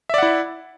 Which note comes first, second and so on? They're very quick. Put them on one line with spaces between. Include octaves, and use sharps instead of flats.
E5 D5 F#5 E4